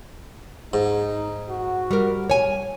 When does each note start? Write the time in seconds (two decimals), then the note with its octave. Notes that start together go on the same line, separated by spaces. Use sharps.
0.73 G#2 D#4
1.49 F#4
1.91 G3 A#4
2.30 C#5 G#5